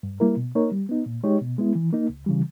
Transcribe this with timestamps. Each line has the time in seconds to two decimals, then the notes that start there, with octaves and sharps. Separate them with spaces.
0.03 G2
0.20 G3 A#3 E4 A#4
0.37 B2
0.55 A#3 D#4 A#4 C#5
0.72 G3
0.89 B3 D#4
1.06 A#2
1.23 G#3 D#4 G4 C#5
1.41 B2
1.58 G#3 B3 E4
1.75 E3
1.93 A#3 D#4
2.10 C#2
2.26 C#3 E3 G3